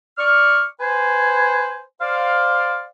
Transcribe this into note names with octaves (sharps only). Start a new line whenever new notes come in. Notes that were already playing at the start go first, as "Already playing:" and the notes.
D5 C#6 F6
B4 C5 G#5
C5 D5 F5